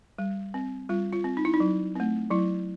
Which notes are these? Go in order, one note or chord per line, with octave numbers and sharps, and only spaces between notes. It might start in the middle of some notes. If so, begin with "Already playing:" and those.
G3
C4
G3 F4
F4
C4
D#4
E4
D#4
F#3
A3 C4
F#3 E4